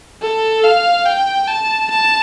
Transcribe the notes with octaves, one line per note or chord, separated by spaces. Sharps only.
A4
F5
G5
A5
A5